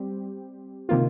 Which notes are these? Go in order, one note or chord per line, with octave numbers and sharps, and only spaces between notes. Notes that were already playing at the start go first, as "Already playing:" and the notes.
Already playing: G3 C4 G4
C3 D#3 A#3 F4